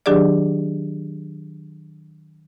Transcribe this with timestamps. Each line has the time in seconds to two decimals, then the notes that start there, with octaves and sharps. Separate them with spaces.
0.06 D#3 F#3 D4 G4 G#4 D5